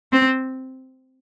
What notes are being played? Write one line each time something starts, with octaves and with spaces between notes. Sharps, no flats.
C4